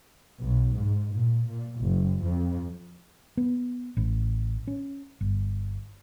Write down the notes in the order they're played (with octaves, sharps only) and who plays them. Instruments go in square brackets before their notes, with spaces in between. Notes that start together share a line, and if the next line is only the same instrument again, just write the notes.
[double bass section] B1
G#2
A#2
A#2
F#1
F2
[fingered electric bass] B3
A1
C#4
G1